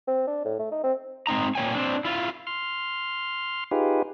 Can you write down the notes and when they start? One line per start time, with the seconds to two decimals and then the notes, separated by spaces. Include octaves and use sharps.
0.08 C4
0.27 D4
0.45 A2
0.59 A3
0.71 D#4
0.84 C4
1.27 G#3 C4 D#4 A#5
1.55 A#2 A3 C#5 G5 G#5
1.75 C4 D4
2.05 E4 F4
2.47 C6 F6
3.71 D#4 F4 G4 G#4 B4